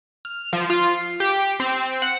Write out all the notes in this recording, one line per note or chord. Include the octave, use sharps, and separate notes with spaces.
F6
F3
F4
C7
G4
C4
F#5